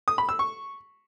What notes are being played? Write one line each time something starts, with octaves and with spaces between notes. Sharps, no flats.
D#6
B5
E6
C#6